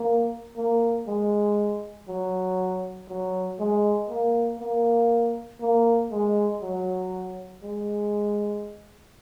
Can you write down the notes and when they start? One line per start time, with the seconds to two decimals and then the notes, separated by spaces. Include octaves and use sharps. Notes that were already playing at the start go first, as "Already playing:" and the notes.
Already playing: A#3
0.57 A#3
1.07 G#3
2.09 F#3
3.09 F#3
3.59 G#3
4.09 A#3
4.59 A#3
5.61 A#3
6.11 G#3
6.62 F#3
7.63 G#3